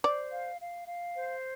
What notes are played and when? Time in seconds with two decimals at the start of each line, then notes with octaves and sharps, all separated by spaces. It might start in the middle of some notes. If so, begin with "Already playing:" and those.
0.04 C5 D5
0.31 F5
0.59 F5
0.87 F5
1.14 C5